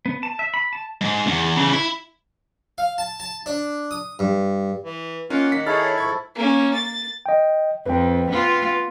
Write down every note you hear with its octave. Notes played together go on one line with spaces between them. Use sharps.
B3
A5
E5
B5
A5
G#2
E2
C#3 E3
E4
F5
A5
A5
D4
D#6
G2
E3
A#3 C#4 D#4 F4 A#4 F#5
D#3 B6
D#4 E4 G#4 A4 C#5 F6 A6
G#2 F3 C#6 G#6
A#3 C#4
A6
D#5 G5
F2 B4 G5
B3 F4